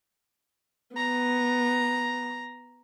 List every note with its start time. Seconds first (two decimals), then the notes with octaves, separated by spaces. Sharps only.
0.96 B3 A#5